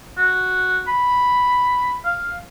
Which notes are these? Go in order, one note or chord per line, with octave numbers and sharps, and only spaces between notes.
F#4
B5
F5